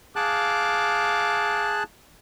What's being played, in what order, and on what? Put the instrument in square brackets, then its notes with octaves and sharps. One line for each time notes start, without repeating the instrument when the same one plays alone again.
[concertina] G#4 A5 F#6 [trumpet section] F5 D6